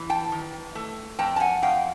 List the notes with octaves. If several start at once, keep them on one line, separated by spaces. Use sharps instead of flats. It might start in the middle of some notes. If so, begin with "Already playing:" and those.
Already playing: E2 E3
G5 A5
D#3
A3
F2 G5 A5
A5
F#5 G#5
F2 F5 G5